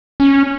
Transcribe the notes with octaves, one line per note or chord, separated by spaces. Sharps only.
C#4